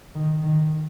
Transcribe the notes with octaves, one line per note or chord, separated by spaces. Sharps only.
D#3
D#3